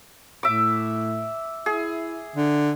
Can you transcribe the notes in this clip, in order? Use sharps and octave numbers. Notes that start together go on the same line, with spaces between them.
A2 E5 D6
E4 G#4
D3